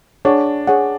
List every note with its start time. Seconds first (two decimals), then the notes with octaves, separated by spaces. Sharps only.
0.25 D4 G#4 C#5 F#5
0.67 G#4 C#5 F#5